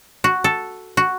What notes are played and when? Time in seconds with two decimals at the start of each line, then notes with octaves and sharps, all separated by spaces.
0.24 F#4
0.44 A4
0.97 F#4